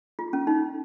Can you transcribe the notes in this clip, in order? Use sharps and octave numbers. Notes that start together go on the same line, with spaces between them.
F4
C#4
D#4